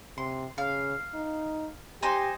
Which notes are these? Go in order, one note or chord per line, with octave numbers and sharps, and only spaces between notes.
C3 C6
C#3 F5
D#4
D#4 G4 C5 G#5